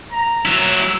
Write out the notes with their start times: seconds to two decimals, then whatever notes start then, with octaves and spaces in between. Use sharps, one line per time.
0.12 A#5
0.45 F#3 E4 E6